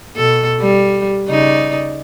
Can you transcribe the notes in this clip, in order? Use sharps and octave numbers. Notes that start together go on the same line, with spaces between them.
B2 A4
G3
C#3 D#4 D5